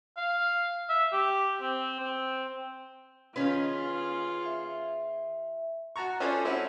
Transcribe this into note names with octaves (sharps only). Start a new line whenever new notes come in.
F5
E5
G4
C4
C4
D#3 C#4 F4 G#4 B4
E5
F#4 A5 A#5 C#6
C#4 F4 G#4 A4 C5 D5
C4 C#4 E4 F#4 B4